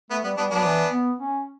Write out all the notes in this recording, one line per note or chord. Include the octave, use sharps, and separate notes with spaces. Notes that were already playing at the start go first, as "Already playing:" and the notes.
A3 B3
G3 B3
G3 B3 D4
F#3 B3 D4
E3
B3
C#4